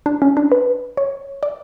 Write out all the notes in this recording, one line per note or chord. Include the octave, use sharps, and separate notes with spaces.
D4
C#4
D4
B4
C#5
D5